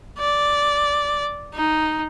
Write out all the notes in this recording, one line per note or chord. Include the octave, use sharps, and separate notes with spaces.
D5
D#4